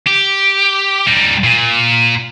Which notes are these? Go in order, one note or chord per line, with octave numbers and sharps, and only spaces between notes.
G4
G3 D#4
A#2